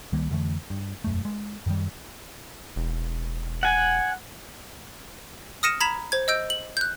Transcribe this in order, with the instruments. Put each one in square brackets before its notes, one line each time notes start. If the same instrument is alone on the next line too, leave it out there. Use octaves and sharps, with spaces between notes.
[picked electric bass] C#2 D#3 G3 A#3
F2 D3 E3 A3
G2
E1 F#2 A3
G#3
F#2 D#3 G3
[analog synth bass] E1
[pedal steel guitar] F#5 G#5
[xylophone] D#6 F6 A#6 C#7 D#7 E7
A#5 B5 G#6 B6 E7 F7
C5 G#6
D#5 E6 G6 D7
F#7
F#6 G6